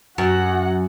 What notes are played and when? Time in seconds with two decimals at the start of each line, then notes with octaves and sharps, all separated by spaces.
0.18 F#2 F#4 F#5